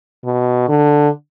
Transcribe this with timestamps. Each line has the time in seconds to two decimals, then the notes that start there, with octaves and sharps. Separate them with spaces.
0.25 B2
0.69 D3